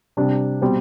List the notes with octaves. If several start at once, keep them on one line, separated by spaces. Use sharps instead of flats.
C3 G3 D4
B2 G3 C4